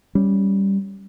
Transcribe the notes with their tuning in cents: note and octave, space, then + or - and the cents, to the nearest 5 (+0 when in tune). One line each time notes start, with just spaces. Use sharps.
G3 +0 C#4 +0